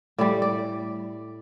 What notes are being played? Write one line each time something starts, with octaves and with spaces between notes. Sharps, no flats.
A2 G3 D5
D5